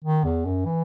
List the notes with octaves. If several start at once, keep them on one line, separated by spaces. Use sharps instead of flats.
D#3
E2
F#2
E3